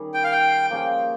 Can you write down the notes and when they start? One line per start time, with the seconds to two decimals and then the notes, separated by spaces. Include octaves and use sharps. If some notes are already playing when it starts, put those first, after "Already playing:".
Already playing: D#3 G3 C#4 G#4
0.14 G5
0.24 F5
0.32 G5
0.70 F3 A#3 C#4 G#4